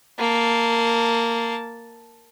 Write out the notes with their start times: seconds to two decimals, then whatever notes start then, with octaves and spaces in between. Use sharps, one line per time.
0.19 A#3 A5